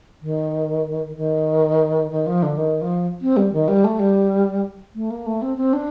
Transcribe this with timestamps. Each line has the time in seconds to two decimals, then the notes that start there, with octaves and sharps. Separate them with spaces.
0.21 D#3
1.16 D#3
2.11 D#3
2.26 F3
2.43 D3
2.57 D#3
2.82 F3
3.22 C4
3.37 G3
3.53 D#3
3.68 G3
3.84 A3
3.99 G3
4.95 A3
5.11 A#3
5.26 A3
5.42 C4
5.57 C4
5.73 D4